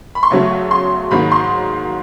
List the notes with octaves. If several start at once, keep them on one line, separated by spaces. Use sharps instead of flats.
B5
C6
E2 C#3 F#3 A3 C#6
C6
G#2 D#3 F#3 A#3 D#4 B5
C6